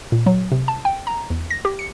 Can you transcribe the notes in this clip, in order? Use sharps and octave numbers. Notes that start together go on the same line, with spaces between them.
A#2
F#3
C3
A5
G5
A#5
E2
A#6
G4
C#7